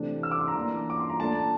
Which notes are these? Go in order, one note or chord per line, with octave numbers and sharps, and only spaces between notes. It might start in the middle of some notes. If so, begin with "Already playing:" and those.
Already playing: C3 E3 A3 D4
E6
D6
C6
A#5
E3 A#3 D4
D6
C6
A#5
A#2 A3 D4 A5